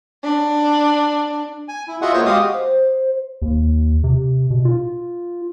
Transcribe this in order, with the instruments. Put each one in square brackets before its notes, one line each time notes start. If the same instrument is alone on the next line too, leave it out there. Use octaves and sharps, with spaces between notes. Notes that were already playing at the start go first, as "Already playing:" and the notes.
[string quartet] D4
[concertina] G#5
E4
F4 F#4 G#4 D#5 E5 F#5
A#3 B3 F4 C5 C#5 C#6
G#3 F#4 G4 F5 D#6
[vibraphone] C5
[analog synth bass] D#2
C3
B2
F4